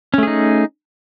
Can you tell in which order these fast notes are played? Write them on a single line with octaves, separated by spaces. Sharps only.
C#4 A3 G#4 D#4